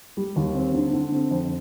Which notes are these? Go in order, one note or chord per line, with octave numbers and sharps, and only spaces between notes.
G3
D#2
C4
D3
D3
C4
F2